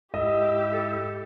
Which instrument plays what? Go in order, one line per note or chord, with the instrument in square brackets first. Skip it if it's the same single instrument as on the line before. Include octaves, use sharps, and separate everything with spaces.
[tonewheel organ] G#2 E4 E5 [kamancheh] G4 [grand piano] D#5
[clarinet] A4